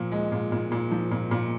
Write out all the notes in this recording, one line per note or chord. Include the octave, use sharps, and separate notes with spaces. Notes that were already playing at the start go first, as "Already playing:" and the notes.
Already playing: A#2 F3
G#3
A#2
A#2
A#2
F3
A#2
A#2